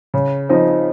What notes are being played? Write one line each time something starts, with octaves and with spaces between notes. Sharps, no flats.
C#3
F3 C4 D#4